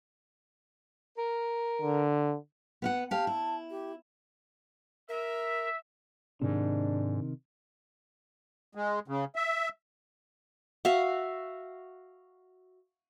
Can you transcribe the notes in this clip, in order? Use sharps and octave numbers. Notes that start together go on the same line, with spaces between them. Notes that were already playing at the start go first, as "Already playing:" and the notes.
A#4
D3
B3 F5 F#5
G4 F5 A5
E4
G4
A#4 E5
G#2 C3 D#3 D4
G#3
C#3
E5
F#4 E5 F5